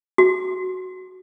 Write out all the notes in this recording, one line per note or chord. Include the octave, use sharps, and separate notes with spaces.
F#4